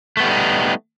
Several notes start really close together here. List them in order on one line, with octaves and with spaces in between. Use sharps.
A3 B3 G3 E4 D#4